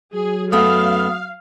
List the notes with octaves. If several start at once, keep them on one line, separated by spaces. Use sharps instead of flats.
F#3 G#4
F#2 A3 B3 F5 D#6